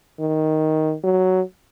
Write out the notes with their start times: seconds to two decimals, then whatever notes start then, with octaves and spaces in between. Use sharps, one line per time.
0.19 D#3
1.04 F#3